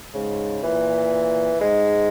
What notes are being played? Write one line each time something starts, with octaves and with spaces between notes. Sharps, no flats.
G#2 C#3
A#2 E3
G#2 G#3